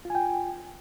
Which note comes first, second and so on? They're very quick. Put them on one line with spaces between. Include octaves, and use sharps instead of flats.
F4 G#5 G5